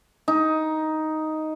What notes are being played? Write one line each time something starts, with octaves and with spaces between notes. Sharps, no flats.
D#4